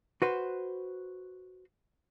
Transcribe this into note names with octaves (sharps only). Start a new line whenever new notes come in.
F#4 B4 C5